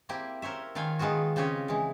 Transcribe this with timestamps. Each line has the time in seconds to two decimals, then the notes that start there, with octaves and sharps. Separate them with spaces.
0.09 A#3 C4 E4 G4
0.42 A#4 C5 C#5 E5
0.75 D#3 F4 F5 G5 G#5
0.99 D#3 G#3 B3 F4 F#4
1.36 C#3 C4 F4 G4 C#5 D#5
1.68 E3 G#3